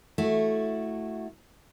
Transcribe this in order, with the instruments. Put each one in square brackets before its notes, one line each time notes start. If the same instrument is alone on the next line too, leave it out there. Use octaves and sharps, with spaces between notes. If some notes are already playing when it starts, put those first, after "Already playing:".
[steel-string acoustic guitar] A3 E4 F#4